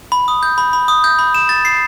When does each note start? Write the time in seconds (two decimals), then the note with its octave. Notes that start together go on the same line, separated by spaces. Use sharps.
0.12 B5
0.28 D#6
0.43 G6
0.58 B5
0.73 B5
0.88 D#6
1.04 G6
1.19 B5
1.34 E7
1.49 A6
1.65 C7